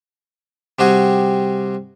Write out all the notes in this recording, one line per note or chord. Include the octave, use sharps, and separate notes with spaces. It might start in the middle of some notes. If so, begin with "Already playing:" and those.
C3 G3 F#4 G#4